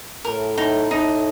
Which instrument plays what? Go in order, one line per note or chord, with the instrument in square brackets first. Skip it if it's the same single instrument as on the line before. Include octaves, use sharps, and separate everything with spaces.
[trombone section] A2 [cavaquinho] A#4
[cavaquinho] D#4
D#4